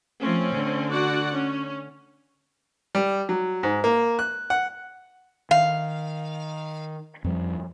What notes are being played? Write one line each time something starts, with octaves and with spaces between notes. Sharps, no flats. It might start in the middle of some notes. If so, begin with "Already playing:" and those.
F3 A3 C4 C#4
D3
F#4 D5 F#5
C#4
G3
F#3
G#2
A#3
F#6
F#5
D#3 F5
F2 F3 G3